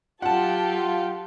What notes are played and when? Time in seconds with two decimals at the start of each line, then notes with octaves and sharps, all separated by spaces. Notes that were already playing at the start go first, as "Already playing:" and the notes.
0.22 F#3 F4 G4 A4 F#5 A5